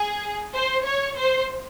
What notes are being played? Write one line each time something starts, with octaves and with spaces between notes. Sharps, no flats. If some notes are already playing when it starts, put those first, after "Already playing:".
Already playing: G#4
C5
C#5
C5